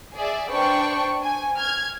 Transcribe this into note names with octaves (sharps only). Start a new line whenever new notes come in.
G#4 D5 E5
D4 B4 C5 D5 G5 C#6
G#5
F6 G#6